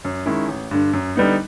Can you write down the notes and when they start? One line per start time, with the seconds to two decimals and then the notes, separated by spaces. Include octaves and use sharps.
0.05 F#2
0.26 D#3 G#3 C#4 E4
0.48 A1
0.71 G2 D3
0.93 F#2
1.16 D3 G3 B3 D#4